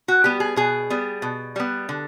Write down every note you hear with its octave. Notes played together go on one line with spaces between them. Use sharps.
F#4
G3 B3 G4
G#4
B2 G#4
G3 B3
B2
G3 B3
D3